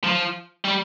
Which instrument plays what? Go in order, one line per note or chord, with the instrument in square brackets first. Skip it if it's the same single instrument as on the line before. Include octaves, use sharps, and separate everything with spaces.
[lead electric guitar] F3
G3